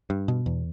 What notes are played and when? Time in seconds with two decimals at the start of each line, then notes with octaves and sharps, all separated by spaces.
0.10 G2
0.28 B2
0.46 E2